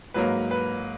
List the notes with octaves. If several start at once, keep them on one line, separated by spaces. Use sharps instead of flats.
G#2 F#3 A#3 B4
B4